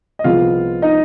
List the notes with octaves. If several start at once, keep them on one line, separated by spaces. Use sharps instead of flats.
D#5
C2 C3 F3 G#3 B3 F4 F5
D#4 D#5